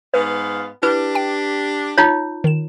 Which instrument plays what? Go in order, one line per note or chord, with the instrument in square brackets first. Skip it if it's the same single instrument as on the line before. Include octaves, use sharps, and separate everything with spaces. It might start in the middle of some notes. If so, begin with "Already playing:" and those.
[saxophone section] G#2 B3 F5 [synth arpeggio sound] B4
[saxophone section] D4 G4 [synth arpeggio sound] E4 [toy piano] B4
[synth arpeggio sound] G5
[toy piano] D#4 F4 C#5
[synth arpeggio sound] D#3 E7